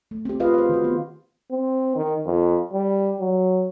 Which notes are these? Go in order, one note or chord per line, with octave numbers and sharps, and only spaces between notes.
A3
C4 G4
F4 G#4 B4 D#5 F5
C5 F5
D#3 F#4
B3
C4
D#3
F2
G3
F#3